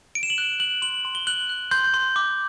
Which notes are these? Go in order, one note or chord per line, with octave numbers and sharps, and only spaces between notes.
D7
E7
F#7
F#6 G7
F#6 F#7
C6 F#7
C6
G7
F#6 F#7
F#6
C6 G6
C6
D6